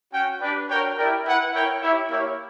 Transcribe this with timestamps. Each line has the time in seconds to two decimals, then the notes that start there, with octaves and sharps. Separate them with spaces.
0.12 C#4 F#4 C#5 G5
0.39 D4 G4 B4 D5 G5
0.68 D4 F#4 A#4 C#5 G5
0.95 E4 G4 A#4 D5 G5
1.25 E4 B4 F#5
1.53 E4 A#4 C#5 G5
1.80 E4 G4 C#5 E5
2.09 A#3 E4 G4 C#5